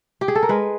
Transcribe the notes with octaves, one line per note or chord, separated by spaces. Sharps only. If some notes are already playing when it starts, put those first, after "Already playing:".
G4
G#4
A4
A#4
G#3 B4